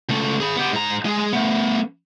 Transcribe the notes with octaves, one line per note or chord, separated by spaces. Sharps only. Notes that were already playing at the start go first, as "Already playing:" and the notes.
C#2 A3
G#4 B5
B3 G4
G#2 A#5
G#3 G#4
A3 B3